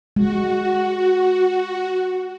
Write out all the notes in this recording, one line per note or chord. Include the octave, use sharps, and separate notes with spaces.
G#3 F#4